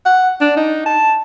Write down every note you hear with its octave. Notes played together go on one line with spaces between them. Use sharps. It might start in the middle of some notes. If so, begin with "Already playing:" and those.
F#5
D4
D#4
A5